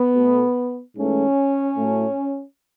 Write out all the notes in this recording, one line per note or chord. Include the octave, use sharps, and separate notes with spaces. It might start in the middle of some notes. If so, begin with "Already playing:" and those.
Already playing: B3
B2 A3
G#2 E3 A3 C#4
A2 F#3 A3